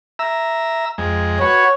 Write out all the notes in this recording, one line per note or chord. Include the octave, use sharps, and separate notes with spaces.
E5 A#5 E6
F2 G#3
F#4 B4 C#5